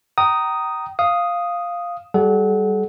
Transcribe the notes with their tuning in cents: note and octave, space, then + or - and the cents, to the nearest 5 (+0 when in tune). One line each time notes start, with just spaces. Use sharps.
G5 -30 A#5 +0 D#6 +0
F5 +0 D#6 +0
G3 -10 A4 -40 F#5 +0